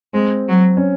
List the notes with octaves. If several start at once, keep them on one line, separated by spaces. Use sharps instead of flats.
G#3 C4
F#3
C#4